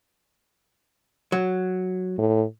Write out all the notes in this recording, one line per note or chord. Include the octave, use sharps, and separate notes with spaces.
F#3
A2